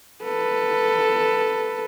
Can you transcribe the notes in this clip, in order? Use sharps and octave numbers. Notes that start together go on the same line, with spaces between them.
A4 B4